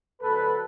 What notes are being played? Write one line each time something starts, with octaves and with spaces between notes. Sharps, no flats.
D2 D3 F#3 A4 B4